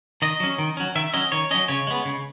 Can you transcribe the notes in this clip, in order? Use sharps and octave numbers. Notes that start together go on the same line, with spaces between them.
D#3 D#5
F#3 C#4
D#3
F#3 C#4
D#3 E5
F#3 C#4 D#5
D#3 C#5
F#3 C#4 D#5
C#3 C#5
G#3 B3
C#3